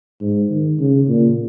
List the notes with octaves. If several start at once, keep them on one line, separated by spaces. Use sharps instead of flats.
G#2
D#3
C#3
A#2